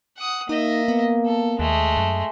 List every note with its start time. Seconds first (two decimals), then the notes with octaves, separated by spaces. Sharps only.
0.18 F#5 D#6
0.49 A#3 D#4 D#5 E5
0.88 B3
1.26 A4
1.59 D#2 G#3 A3
1.97 F#2